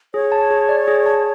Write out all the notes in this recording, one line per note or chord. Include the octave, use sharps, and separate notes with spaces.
G#4 C#5
A5
G#4
D5
G#4
A5